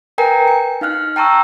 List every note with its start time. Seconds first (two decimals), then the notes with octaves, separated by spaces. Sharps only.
0.18 A#4 B4 G5 G#5 A#5
0.48 C#7
0.81 D#4 F5 F6 F#6
1.16 G5 A5 A#5 C#6 E6